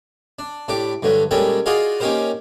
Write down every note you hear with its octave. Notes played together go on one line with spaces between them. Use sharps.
D4
A2 D4 G4 D6
G2 D3 F#3 A3
A#2 G3 G#3 C#4 A4 G5
F4 F#4 G#4 D5 D#5 F5
A#3 C#4 D#4 G4 A#4 C5